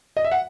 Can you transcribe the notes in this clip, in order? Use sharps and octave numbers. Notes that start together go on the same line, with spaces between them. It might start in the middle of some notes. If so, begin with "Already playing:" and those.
D#5
E5
F#5